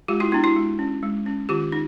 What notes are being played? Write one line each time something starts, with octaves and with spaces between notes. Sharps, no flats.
G#3 F4 G4
E4 F#4
B3 D4 E4
E4 F#4
G#3
C#4
G#3
C#4
D#3 F4 G4
D#4